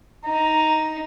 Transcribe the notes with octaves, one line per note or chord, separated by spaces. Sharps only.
D#4 A#5